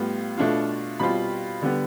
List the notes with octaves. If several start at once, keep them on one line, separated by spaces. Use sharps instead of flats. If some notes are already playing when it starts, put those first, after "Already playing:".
Already playing: A2 G3 B3 F4
B2 A3 D4 F4
B2 G3 C4 F4 B5
D3 G3 B3